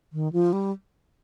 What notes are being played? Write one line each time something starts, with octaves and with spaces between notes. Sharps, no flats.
D#3
F3
G3